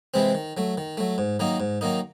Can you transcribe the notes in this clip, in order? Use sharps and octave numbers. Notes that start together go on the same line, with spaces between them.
C3 E3 G#3 C4
D#3
F#3 A3
D#3
F#3 A3
G#2
D#3 F#3 A#3 D#4
G#2
D#3 F#3 A#3 D#4